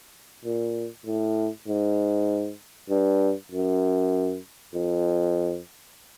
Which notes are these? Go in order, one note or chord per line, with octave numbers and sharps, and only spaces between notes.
A#2
A2
G#2
G2
F#2
F2